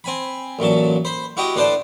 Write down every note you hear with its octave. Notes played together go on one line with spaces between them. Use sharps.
C4 G#5 B5
A1 A#2 F#3 A5
C5 B5
E4 F#4 G4 D#5
A2 D4 B4 C5 D5 A5